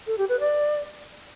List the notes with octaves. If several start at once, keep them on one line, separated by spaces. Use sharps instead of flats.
A4
G4
B4
D5